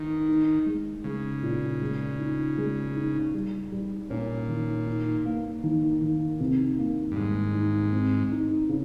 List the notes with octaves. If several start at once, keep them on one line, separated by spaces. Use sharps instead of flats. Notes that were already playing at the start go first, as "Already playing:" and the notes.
Already playing: D#3 D#4
D#4
G#3
C#3 G#3
A#2
G#3
D#4
G#3
D#4
G3
G3
A#2 C#4
D#3
D#4
A#3
D#3
D#3
C3
A#3
G2
G#2 G3
D#4
C4
D#4
C#3